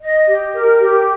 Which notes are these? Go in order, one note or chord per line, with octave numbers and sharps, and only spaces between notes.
D#5
G4
A#4
G4